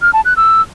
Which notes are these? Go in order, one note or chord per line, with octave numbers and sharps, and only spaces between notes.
F6
A5
F#6
E6